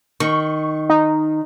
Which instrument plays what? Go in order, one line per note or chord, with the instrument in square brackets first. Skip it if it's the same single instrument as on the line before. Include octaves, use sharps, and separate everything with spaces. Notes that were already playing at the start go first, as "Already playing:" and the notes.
[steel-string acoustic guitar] D#3 [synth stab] C#6
[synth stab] D#4